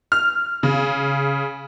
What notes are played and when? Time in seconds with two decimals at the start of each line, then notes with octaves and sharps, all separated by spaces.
0.12 F6
0.63 C#3